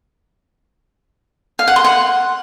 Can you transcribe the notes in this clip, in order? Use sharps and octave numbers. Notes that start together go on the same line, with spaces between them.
F5
F#5
C6
F#5